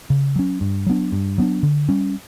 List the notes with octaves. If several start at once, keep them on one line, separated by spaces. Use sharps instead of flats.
C#3
F#3 C#4
G2
F#3 B3 D4
G2
F#3 B3 D4
D3
G3 C#4